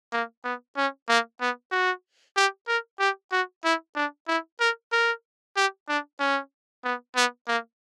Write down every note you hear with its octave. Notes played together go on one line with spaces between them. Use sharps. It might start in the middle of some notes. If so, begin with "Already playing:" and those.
A#3
B3
C#4
A#3
B3
F#4
G4
A#4
G4
F#4
E4
D4
E4
A#4
A#4
G4
D4
C#4
B3
B3
A#3